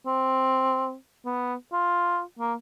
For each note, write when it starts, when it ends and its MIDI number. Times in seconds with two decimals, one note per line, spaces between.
0.06 0.95 60
1.25 1.54 59
1.73 2.21 65
2.39 2.54 58